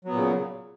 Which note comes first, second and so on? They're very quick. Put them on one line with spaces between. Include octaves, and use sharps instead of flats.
F#3 B3 A#2 C#3